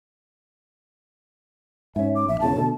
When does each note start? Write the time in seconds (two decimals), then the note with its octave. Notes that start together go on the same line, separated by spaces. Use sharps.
1.96 G#2 C#4 E5
2.15 D6
2.28 A#1 E5
2.40 E1 E2 C#3 A5
2.56 B2 D3 A3